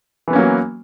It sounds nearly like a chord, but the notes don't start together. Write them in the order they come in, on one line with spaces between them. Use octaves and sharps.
E3 B3 C#4 A#3 F#3